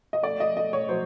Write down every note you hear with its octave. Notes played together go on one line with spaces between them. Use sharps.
D#5
A3 D5
D#5
A3 D#5
C#5
F#3 C5